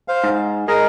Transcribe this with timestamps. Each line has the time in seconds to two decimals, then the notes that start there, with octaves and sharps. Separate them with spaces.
0.08 C5 F5
0.24 G#2
0.68 G#3 A#4 D#5